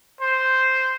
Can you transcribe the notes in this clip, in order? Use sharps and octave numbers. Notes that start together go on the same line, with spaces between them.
C5